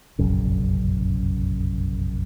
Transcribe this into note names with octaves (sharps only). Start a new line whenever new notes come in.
F1 A#1 F#2 C#3